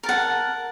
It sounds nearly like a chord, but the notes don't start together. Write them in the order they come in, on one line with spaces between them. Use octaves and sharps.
A#4 A5 F#5